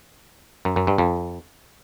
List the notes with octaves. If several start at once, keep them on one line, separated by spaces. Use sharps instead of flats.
F#2
F#2
G2
F2